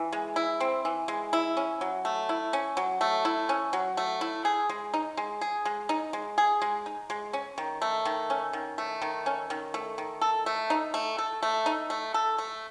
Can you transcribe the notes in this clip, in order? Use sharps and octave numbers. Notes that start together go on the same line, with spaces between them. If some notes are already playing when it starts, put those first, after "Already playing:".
Already playing: E3
G#3
E4
C4
E3
G#3
E4
C#4
F#3
A3
E4
C#4
F#3
A3
E4
C#4
F#3
A3
E4
G#4
G#3
D#4
G#3
G#4
G#3
D#4
G#3
G#4
G#3
D#4
G#3
C#4
D#3
A3
D#3
C#4
D#3
A3
D#3
C#4
D#3
A3
D#3
A4
A3
D#4
A3
A4
A3
D#4
A3
A4
A3